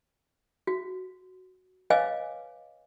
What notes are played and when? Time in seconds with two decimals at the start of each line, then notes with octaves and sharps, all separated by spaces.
0.67 F#4
1.90 B4 C#5 D#5 F5 G#5 D6